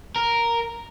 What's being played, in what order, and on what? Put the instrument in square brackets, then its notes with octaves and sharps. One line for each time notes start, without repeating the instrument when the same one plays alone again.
[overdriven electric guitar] A#4